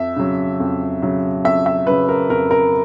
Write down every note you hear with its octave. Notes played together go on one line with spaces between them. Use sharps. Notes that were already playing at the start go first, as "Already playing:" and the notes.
Already playing: F2 E5
C#3 F#3
F2
C#3 F#3
F2 E5
E5
C#3 F#3 B4
A#4
F2 A#4
A#4